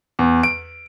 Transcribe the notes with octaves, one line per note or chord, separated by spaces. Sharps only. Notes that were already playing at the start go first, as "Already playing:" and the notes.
E2
D7